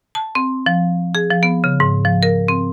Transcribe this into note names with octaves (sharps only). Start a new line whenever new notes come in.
A5
C4
F3
G#4
F3
B3
C#3
G#2
F3
A#4
C4